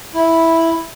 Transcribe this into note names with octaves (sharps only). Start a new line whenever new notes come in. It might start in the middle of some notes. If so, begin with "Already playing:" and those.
E4